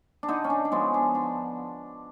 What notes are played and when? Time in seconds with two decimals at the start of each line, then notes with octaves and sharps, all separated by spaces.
0.23 D4
0.28 D3 D#4
0.44 C#4
0.50 D4
0.65 D4
0.72 F3 G#3 B3 C#4
0.94 D4
1.15 D3 D4